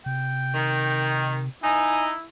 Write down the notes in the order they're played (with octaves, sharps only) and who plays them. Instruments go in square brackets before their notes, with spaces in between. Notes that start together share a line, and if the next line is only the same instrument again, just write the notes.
[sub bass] C3 [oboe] G5
[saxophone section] D#3
[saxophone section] D#4 [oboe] E4 [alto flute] G#5